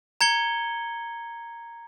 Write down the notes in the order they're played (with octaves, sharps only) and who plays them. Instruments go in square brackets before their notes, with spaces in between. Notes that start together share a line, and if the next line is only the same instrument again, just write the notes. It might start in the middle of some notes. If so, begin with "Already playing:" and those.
[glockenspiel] A#5 G#6 C#7 G7